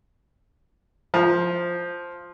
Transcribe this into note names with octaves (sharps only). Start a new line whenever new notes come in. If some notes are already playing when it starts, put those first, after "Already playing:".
F3